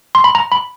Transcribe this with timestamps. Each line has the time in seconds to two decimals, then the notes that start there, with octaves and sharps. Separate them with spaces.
0.15 C6
0.24 B5
0.35 A#5
0.52 B5